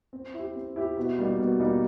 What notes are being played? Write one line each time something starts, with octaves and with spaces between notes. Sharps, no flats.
C4
E4
G4
C4
E4 G4
B2
G3 A#3 D#4
B2
G3 A#3 D#4